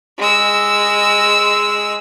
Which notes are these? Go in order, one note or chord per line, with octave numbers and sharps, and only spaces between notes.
G#3 E6